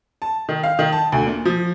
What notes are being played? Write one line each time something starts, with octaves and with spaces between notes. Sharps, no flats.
A5
D#3
F5
D#3
A5
D2
A#2
F3